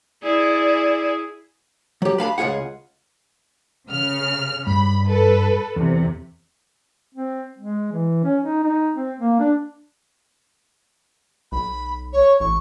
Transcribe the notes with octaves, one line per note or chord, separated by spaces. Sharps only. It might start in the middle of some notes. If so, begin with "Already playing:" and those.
E4 G#4 D5
F#3 G4
B4 F5 A5 B5
C#2 F#2 F4 G#4 F#5
C#3 F6
G2 B5
A4 B4
E2 C3
C4
G#3
E3
C#4
D#4
D#4
C4
A#3
D4
B1 B5
C#5
A1 C#6